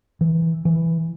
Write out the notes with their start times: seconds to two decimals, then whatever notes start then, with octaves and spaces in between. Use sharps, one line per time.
0.21 E3
0.65 E3